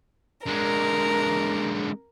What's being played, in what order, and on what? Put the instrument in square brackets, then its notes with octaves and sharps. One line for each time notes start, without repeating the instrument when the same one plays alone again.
[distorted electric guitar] D3 G#3 [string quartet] A#4